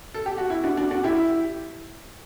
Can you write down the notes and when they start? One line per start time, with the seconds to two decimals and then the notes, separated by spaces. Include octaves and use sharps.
0.14 A4
0.26 G4
0.38 F#4
0.50 E4
0.64 D4 F#4
0.77 D4 F#4
0.91 D4 F#4
1.04 E4 G4